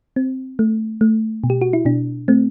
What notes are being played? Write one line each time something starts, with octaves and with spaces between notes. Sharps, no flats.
C4
A3
A3
B2
G4
F#4
E4
B2 D4
A3 C4